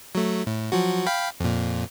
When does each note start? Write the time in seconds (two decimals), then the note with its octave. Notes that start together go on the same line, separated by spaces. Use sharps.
0.15 F#3 A3
0.47 A2
0.72 F3 F#3 F#4
1.06 F5 G5 B5
1.40 F2 A#2